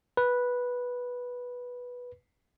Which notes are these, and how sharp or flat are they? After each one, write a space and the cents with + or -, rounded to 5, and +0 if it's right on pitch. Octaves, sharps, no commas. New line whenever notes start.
B4 -10